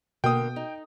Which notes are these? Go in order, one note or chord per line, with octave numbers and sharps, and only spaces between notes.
B2 D3 A#3 G5 D#6
D#4